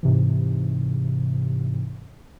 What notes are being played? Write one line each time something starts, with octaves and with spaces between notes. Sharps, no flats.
G#2 C3 E3